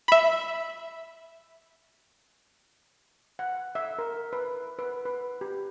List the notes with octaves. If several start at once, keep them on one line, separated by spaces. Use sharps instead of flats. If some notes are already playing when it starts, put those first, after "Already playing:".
E5 B5
F#5
E5
A#4
B4
B4
B4
G4